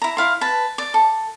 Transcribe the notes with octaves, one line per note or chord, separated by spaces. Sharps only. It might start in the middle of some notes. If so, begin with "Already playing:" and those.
E4 A#5
E4 F5 C6
B4 A5
D5
A4